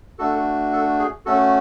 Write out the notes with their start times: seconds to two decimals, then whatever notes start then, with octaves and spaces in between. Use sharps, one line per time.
0.19 A3 D4 F#4 A4
0.73 A4
0.99 G#4
1.26 A3 C#4 F#4 A4